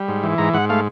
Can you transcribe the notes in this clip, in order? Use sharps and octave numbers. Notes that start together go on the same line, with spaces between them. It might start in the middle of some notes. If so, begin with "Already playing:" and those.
Already playing: G3
G#2
E3
G#2 A#5
G#2 F#5
A3 F5